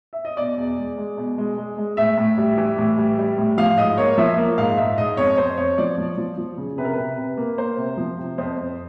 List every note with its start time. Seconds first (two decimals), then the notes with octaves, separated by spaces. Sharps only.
0.13 E5
0.25 D#5
0.37 B2 D5
0.57 E2
0.78 G#3
0.98 G#3
1.17 B2
1.38 G#3
1.57 G#3
1.78 G#3
1.97 A2 E5
2.18 A2
2.38 G3
2.57 E3
2.78 A2
2.97 G3
3.18 G3
3.38 A2
3.58 F3 F5
3.77 G#2 D#5
3.98 A#3 C#5
4.18 F3 E5
4.37 A#3
4.58 G#2 F5
4.77 G#2 E5
4.98 G#2 D#5
5.17 F2 C#5
5.38 F2 C5
5.58 F2 C#5
5.78 F3 D5
5.98 F3
6.18 F3
6.38 F3
6.57 C#3
6.78 C3 B4
6.85 A#4
6.93 C3 B4
7.18 C3
7.37 A#3
7.58 A#3 C5
7.77 C3
7.97 F3
8.18 C3
8.38 F2 C5
8.57 F2